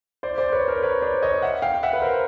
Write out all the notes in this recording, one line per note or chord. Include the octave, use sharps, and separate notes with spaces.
C5 D5
C5 D5
B4 C#5
A#4 C5
B4 C#5
C5 D5
C#5 D#5
E5 F#5
F5 G5
E5 F#5
B4
A#4 C5